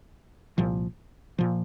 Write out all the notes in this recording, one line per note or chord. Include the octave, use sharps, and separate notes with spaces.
C2 A#2 F3
A#2 F3